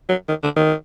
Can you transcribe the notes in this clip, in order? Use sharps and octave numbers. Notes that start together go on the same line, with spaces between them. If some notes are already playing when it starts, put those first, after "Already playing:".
F#3
D#3
D3
D#3